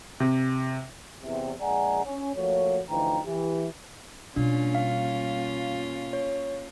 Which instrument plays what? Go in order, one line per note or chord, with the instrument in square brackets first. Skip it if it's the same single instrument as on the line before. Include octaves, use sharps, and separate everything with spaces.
[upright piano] C3
[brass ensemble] E2 C3
A#1 G#3 D5 F#5 G#5 A#5
C#4
F3 A3 A#3 F#4 C#5
D2 E3 F3 D#4 G5 A#5
E3 G4
[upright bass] B2 G3 [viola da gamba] A#3 C#4 F4 [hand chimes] D4
[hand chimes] F5
C#5